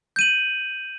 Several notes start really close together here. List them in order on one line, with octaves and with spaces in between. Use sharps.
G6 D#7 F#7